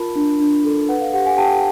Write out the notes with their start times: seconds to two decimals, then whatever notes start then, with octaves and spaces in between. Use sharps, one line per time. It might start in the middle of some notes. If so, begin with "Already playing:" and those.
Already playing: F4 A#4 A5 B5
0.15 D4
0.40 D4
0.65 A4
0.89 B4 F#5
1.01 F5
1.13 G4 F#5
1.26 F#5 G#5
1.38 G4 G5 A5